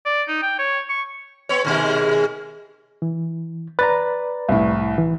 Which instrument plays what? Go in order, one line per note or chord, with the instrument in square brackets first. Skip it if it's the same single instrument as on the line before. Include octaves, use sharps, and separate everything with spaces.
[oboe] D5
D#4
G5
C#5
C#6
[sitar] B3 C#5
D#2 B2 G#3
[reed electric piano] E3
[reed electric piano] B4 D5 A#5 [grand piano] A6
[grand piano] C2 A2
[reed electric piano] E3